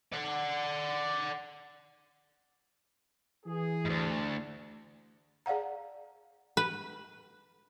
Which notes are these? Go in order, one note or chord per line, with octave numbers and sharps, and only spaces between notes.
D5 F#5
E3 G#4
D2 G#2
G#4 D5 F5 F#5 A#5
B4